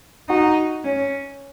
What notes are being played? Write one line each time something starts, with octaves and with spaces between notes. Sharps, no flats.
D#4 F#4
C#4